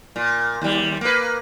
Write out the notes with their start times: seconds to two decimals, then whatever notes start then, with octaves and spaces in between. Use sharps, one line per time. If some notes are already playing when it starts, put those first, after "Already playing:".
0.16 A#2
0.62 D#2 G3
1.01 A#3 B4